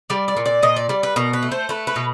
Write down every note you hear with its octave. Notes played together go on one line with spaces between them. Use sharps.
G3 D5
D5
A#2
D5
A#2 D#5
D5
G3 D5
B4
B2 A#4
B4
A3
C5
A3 B4
B4
B2